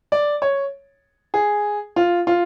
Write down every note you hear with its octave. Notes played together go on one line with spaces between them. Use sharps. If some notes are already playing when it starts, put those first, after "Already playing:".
D5
C#5
G#4
F4
F4